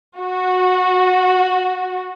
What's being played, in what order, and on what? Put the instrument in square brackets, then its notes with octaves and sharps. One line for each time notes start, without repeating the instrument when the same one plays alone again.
[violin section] F#4